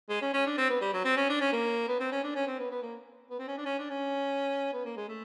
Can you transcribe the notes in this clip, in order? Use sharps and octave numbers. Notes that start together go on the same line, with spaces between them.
G#3
C#4
C#4
D4
C4
B3
G3
F#3
C4
C#4
D4
C#4
A#3
B3
C4
C#4
D4
C#4
C4
B3
B3
A#3
B3
C4
C#4
D4
C#4
D4
C#4
B3
A#3
G#3
A3